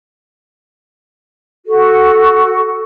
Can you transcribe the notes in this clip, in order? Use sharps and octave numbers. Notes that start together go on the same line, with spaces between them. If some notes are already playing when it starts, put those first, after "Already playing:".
F#4 A4